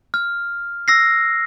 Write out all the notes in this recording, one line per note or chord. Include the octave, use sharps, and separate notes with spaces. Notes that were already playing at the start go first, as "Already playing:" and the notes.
F6
E6 A#6 C7